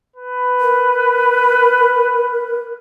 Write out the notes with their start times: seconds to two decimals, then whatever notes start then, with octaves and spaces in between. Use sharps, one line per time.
0.16 B4
0.60 A#4